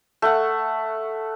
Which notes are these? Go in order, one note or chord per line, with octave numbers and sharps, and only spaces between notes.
A3 F#5